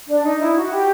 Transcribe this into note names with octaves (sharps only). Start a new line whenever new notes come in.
D4
D#4
E4
F#4
G4